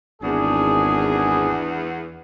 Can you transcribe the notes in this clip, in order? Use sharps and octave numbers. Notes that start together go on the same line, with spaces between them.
G#1 E2 D4 G#4